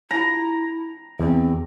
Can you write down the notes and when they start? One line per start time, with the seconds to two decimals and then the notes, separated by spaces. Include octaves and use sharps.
0.11 E4 A#5
1.19 E2 C4